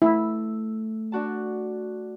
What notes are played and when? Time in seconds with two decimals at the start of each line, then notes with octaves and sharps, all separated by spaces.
0.02 A3 E4 E6
1.12 D4 F#4 A5